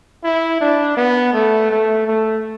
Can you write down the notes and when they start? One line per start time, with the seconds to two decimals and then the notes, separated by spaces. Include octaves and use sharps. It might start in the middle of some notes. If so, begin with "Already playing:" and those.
0.24 E4
0.60 D4
0.97 B3
1.33 A3
1.70 A3
2.07 A3